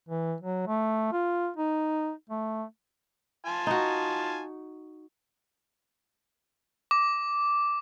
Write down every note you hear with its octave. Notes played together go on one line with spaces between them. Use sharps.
E3
F#3
A3
F4
D#4
A3
F4 G#5 A5
D#4 F#4
D6